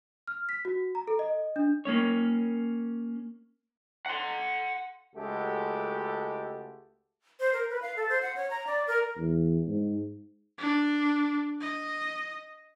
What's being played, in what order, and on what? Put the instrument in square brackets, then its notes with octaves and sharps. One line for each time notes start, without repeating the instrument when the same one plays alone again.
[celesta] F6
B6
F#4
A#5
A4
D#5
D4
[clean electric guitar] A#3 C#4 C#5
[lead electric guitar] F#5 C6
[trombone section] C#2 G#3 A3 F#4 G4 A4
[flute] C5
A#4
B4
F5
A4
C5
F#5
C#5
A#5
D5
A#4
[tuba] E2
G#2
[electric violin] D4
D#5